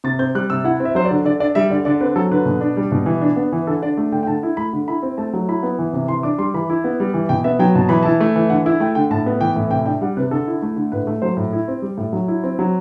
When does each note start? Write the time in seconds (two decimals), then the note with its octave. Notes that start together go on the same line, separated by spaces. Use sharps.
0.04 C3 A6
0.19 C4 G6
0.35 G3 F#6
0.50 C3 E6
0.64 E4 F#5
0.80 C4
0.85 E5
0.95 F#3 C5
1.05 D5
1.11 D3
1.25 D3 D5
1.40 D4 D5
1.55 G3 E5
1.70 D3 D5
1.85 D3 D5
2.01 C4 B4
2.16 F#3 A4
2.31 D3 B4
2.46 B2
2.61 D4
2.77 G3
2.92 B2
3.06 E3
3.21 D4
3.36 B3
3.52 E3
3.67 D3 A4
3.82 D4 D5
3.97 A3
4.12 D3 G5
4.23 G5
4.27 D3 A5
4.43 E4
4.57 A3 B5
4.73 D3
4.88 E4 B5
5.03 C4
5.18 A3 A5
5.33 F#3
5.48 E4 B5
5.63 B3
5.79 E3
5.93 C3
6.08 E3 C6
6.23 D4 D6
6.38 G3 C6
6.54 E3 B5
6.70 E4
6.84 B3
7.00 G3
7.14 E3
7.29 B2 G5
7.44 B3 E5
7.59 F#3 G5
7.75 B2 A5
7.89 E3 B5
8.03 E4 A5
8.20 A3
8.36 E3
8.50 D3 F#5
8.66 E4 E5
8.80 A3 G5
8.95 D3 G5
9.11 A2 A5
9.26 B3
9.41 E3 G5
9.56 A2
9.71 C3 G5
9.86 D4 G5
10.01 G3 F#5
10.17 C3 B4
10.31 D3 A4
10.47 E4
10.62 A3
10.76 D3
10.92 A2 B4
11.07 A3
11.22 F#3 C5
11.37 A2
11.53 E4
11.68 C4
11.82 G3
11.98 A2
12.13 F#3
12.28 E4
12.44 C4
12.59 F#3